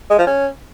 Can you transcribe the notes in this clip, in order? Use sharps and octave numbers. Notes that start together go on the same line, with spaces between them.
G#3
F3
C#4